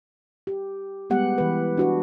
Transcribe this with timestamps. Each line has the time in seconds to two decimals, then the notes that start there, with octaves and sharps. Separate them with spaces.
0.47 G4
1.10 G3 G#3 B3 G4 F#5
1.38 E3 B4
1.77 D4 F#4 B4